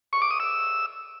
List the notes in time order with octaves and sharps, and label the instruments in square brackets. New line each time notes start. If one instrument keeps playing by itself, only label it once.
[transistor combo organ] C#6
D6
D#6
E6